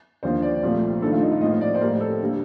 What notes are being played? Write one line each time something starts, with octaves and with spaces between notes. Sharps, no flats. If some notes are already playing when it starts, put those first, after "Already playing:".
D#2 D3 F3 A#3 C5
D5
C2 A#2 F3 A3
G2 D#3 A3 A4
F4
D#4
F4
A2 F3 A#3 D#5
D5
C5
A2 G3 A#3 A#4
A4
D3 G3 A#3